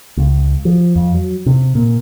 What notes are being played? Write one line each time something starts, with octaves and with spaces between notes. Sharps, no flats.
C#2
F3
F2
F#3
C3
A#2